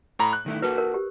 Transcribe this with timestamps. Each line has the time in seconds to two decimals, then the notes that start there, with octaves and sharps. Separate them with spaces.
0.19 A2 A#5 B5
0.33 F#6
0.46 D#3 A3 E4
0.62 A#3 F#4 A4 B4
0.78 A#4
0.94 G4